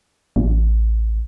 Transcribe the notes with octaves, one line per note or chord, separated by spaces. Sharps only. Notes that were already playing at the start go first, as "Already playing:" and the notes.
A1